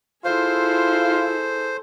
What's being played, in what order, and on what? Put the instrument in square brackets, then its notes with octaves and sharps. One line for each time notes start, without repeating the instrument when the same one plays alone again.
[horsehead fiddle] E4 [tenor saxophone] F4 [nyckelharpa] G#4 A4 [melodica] C5